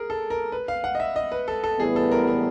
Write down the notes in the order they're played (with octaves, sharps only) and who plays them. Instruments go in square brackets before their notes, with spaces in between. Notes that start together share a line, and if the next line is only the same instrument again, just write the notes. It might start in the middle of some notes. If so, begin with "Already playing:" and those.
Already playing: [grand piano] G#4 A#4
A4
A#4
B4
F5
F#5
D#5
E5
D#5
B4
A4
A4
[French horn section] A2 E3 G3 B3 [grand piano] G#4
[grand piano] A4
A#4
A#4